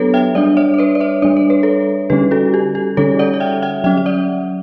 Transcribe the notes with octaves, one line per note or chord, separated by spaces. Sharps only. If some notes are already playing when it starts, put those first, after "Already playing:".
Already playing: F#3 B3 D4 F#4 G4 A4 B4 C#5
E5 G5
G3 D4 D5 F#5
C#5 E5
C#5
B4 D5
D5
C#5 E5
G3 D4 D5
C#5
B4
A4 C#5
D3 G3 C#4 G4 B4
F#4 A4
G4
G4
D3 G3 C#4 A4 C#5
D5 F#5
F#5
E5 G5
E5 G5
F#3 C#4 E5 G5
E5
D5 F#5